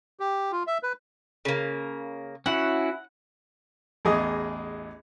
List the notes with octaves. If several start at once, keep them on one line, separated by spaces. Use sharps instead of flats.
G4
F4
E5
B4
C#3 A#3
C#4 E4 F#4 F#5
A1 E2 G#4 D#5